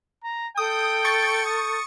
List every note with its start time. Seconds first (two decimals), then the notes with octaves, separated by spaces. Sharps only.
0.24 A#5
0.58 A4 G5 D#6 G6
1.05 C#6 A6 C#7
1.45 D#6